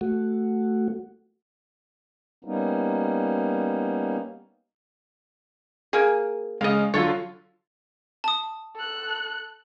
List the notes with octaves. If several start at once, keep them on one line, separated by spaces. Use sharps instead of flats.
A3 F#4
G3 A#3 B3 C#4 D#4
A#3 G#4
C#3 G#3 D#5 F5
D3 F#3 F4 A4 C#5
A5 D#6
A4 F#6